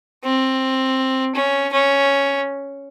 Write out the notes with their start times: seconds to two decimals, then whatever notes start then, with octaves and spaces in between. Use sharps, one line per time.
0.25 C4
1.36 C#4
1.73 C#4